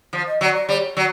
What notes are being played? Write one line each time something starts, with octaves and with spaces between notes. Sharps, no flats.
F3
D#5
F#3 D5
D5
G3 C#5
F#3